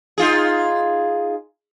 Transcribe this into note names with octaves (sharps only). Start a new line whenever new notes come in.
D#4 F4 G#4